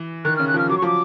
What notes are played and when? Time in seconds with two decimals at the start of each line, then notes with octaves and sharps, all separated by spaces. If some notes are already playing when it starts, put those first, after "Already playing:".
Already playing: E3
0.25 D#3 F#6
0.37 C#3 F6
0.48 F#6
0.54 F3 F6
0.69 F#3 D6
0.78 C#6
0.82 F3 D6